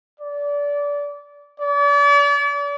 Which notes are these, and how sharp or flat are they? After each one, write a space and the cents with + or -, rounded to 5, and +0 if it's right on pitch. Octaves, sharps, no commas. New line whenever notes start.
D5 -25
D5 -40